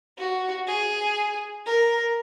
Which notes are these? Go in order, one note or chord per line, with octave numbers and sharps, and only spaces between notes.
F#4
G#4
A#4